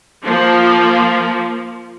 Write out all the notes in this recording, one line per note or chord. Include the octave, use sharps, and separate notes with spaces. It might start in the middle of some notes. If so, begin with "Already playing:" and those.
F3 A#3